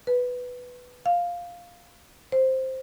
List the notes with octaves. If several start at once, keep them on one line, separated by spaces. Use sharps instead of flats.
B4
F5
C5